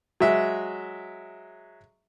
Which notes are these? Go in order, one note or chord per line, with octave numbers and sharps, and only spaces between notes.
F#3 G#3 E5